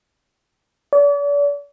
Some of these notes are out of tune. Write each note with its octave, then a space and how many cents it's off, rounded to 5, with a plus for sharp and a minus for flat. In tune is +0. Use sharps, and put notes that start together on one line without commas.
D5 -40